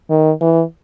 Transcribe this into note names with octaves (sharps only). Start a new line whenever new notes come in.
D#3
E3